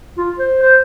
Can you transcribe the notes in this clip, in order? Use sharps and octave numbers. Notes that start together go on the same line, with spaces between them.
F4
C5
C5